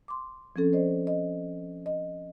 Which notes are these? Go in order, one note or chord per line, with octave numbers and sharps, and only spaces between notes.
C6 D6
F3 C4 C#4 A4
C5 D5 D#5
D#5
D#5